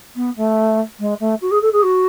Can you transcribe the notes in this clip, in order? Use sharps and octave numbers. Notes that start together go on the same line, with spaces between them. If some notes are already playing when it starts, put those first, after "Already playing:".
B3
A3
G#3
A3
F#4
G#4
A4
G#4
F#4